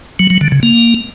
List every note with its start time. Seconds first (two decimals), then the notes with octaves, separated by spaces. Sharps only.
0.19 F#3
0.30 F#3
0.41 D3
0.52 C#3
0.63 A#3